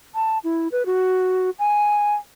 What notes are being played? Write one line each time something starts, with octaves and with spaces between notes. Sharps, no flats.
A5
E4
B4
F#4
G#5